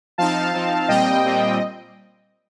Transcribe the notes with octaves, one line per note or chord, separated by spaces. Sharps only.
F3 C4 D#4 F5 A5
F3 C4 D#4
A#2 G3 C4 D#5 G5
A#2 G3 C4